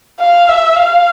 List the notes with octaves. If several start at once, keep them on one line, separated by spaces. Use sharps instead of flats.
F5
E5
F5